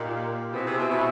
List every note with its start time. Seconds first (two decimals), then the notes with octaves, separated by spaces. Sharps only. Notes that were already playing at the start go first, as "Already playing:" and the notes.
Already playing: A#2 A#3 D#4 G4
0.53 B2 C4 E4 G#4 B4 E5
0.66 C3
0.78 B2
0.91 B2